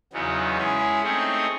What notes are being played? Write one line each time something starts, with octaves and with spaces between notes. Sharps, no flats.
E2 C#3 F#3 B3 D#4
G#3 C#4 E4 G#4 C#5
A3 C4 D#4 G#4 C#5